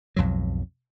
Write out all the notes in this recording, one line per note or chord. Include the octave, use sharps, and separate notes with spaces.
B1 F2 G#2 F#3